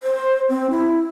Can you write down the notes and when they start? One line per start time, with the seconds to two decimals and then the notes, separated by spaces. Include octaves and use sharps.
0.03 C5
0.49 C4
0.71 E4